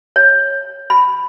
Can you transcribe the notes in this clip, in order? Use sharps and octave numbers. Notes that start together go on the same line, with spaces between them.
C#5
B5